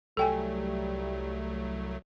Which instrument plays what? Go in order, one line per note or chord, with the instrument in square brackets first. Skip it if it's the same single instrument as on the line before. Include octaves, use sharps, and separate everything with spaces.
[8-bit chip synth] C2 F#3 A3 [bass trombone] G3 [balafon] A4 G5 G#5